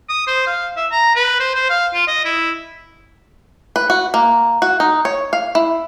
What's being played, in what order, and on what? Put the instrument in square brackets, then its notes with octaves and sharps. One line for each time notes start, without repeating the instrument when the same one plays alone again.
[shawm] D#6
C5
F5
E5
A#5
B4
C5
C5
F5
F4
D#5
E4
[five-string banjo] B4
F#4
A#3
F#4
D#4
C#5
F5
E4